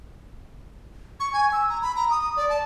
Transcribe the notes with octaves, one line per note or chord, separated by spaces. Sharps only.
C#6
G#5
E6
A#5
B5
A#5
D#6
D5
A5